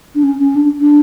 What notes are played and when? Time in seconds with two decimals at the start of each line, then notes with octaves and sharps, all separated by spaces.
0.15 D4
0.23 C#4
0.39 C#4
0.56 D4
0.80 D4